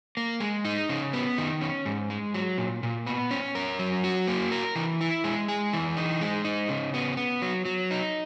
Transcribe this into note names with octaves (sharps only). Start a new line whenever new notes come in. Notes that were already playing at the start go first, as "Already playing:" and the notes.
A#3
G#3
D#4
C#3
B3
D#3
C#4
G#2
G#3
F#3
A#2
A#2
B3
C#4
A#4
F#3
F#4
A#3
A#4
E3
E4
G#3
G#4
E3
D#4
G#3
D#4
C#3
B3
B3
F#3
F#3
D#4